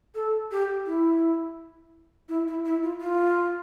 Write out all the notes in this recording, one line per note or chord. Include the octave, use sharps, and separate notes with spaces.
A4
G4
E4
E4
E4
E4
F4
F4